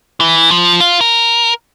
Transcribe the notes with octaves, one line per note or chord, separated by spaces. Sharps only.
E3
F3
F4
A#4